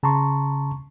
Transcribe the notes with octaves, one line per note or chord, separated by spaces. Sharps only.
C#3 A5 A#5 C6 C#6